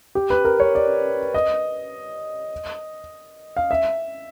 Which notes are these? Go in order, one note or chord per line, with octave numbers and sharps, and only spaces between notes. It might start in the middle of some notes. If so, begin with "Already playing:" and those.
G4
B4
A#4
C#5
D5
D#5
F5
E5